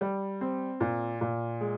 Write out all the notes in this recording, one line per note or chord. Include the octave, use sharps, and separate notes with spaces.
G3
C4
A#2
A#2
G#3